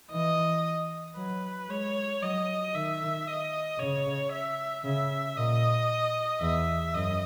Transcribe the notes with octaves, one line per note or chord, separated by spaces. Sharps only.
E3 D#5
F#3 B4
G#3 C#5
F#3 D#5
D#3 E5
D#5
C#3 C#5
E5
C#3 E5
A#2 D#5
E2 E5
F#2 D#5